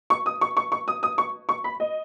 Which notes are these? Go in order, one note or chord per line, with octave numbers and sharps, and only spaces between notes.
C#6
D#6
C#6
C#6
C#6
D#6
D#6
C#6
C#6
B5
D#5